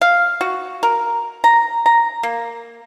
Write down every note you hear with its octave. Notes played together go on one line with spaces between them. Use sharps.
F5
F#4
A#4
A#5
A#5
A#3